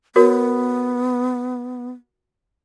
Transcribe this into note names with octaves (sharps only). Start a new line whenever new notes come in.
B3 F#4 A#4 C#5